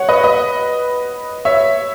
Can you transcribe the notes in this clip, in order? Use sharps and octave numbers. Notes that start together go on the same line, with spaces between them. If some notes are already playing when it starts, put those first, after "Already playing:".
Already playing: C#5 F#5
B4 D#5
B4 D#5
C#5 E5